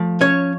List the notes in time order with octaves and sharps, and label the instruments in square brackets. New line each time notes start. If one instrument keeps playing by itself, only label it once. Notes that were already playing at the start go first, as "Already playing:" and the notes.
Already playing: [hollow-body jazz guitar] F3 A3
C#4 C#5